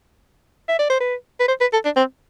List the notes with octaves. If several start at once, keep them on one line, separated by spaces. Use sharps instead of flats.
E5
D5
C5
B4
B4
C5
B4
A4
D4
C4